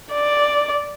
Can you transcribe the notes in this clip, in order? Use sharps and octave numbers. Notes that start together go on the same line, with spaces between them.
D5